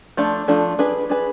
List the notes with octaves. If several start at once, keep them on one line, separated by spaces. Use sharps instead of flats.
F3 A3 D4
F3 A3 D4
D4 G#4 B4
D4 G#4 B4